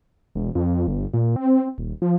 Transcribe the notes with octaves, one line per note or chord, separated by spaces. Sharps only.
E1
F2
G1
A#2
C4
D#1
F3